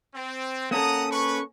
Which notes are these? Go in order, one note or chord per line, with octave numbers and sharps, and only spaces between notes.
C4
A#3 C#4 A4 F#5 A#5 D#6
B4 C#6